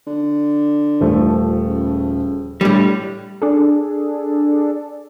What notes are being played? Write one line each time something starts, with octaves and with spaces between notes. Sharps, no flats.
D3
D#1 F3 A3
C#3
A2 D3 G3
D4 G#4 A4